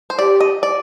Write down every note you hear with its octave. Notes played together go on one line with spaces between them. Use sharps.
C5
G4 D5
D#5
D5